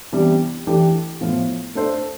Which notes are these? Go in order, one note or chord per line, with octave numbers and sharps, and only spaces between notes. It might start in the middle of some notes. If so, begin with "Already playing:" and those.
C3 E3 G3 B3 D4
E3 A3 D4 G4 B4
A2 F3 B3 F4
A3 D4 A4 C5